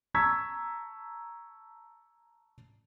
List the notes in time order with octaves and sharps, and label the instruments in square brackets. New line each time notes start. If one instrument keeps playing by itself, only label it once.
[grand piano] A5 A#5 C#6 E6 G#6 B6